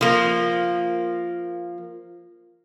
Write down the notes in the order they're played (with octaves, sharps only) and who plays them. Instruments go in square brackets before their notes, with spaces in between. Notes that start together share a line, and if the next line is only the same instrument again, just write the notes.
[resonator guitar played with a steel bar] F3 A#3